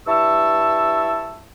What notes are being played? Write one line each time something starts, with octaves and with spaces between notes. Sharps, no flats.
G2 E4 A5 C#6 E6